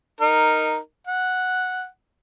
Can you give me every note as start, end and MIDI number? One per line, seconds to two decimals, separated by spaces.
0.21 0.78 63
0.21 0.78 70
1.07 1.86 78